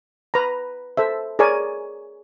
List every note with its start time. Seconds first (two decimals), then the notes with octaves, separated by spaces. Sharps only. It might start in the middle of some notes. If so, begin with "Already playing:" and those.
0.34 B4 A#5
0.97 A4 C5 E5
1.39 G#4 A#4 C#5 D5 G#5